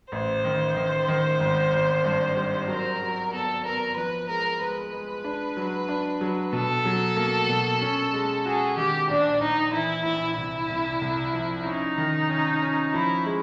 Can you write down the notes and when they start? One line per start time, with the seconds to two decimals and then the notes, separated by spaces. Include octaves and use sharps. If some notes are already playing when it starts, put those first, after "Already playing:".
0.12 A1 C5
0.45 D#3
0.77 D#3
1.08 D#3
1.40 G#1
1.73 G#1
2.04 G2
2.37 G3
2.68 F#3 A#4
3.01 F#3
3.32 B3 A4
3.65 B3 A#4
3.97 F3 B4
4.28 G#3 A#4
4.60 G#3 B4
4.93 G#3
5.24 D4
5.57 F#3
5.89 D4
6.21 F#3
6.53 B2 A4
6.85 F#3
7.16 A#3
7.49 B2
7.81 C#4
8.13 G#3
8.45 F#4 G#4
8.77 D#3 G4
9.09 A#1 D4
9.41 A#1 D#4
9.73 E3 E4
10.05 A#1 E4
10.38 C2 E4
10.70 C2
11.01 C2
11.33 F3
11.65 C#4 D#4
11.98 D#3
12.29 C#4
12.62 C#4
12.93 F3 E4
13.26 G#3